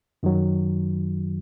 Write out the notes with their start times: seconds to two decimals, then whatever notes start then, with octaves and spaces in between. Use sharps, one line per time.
0.23 F#2 D#3 F#3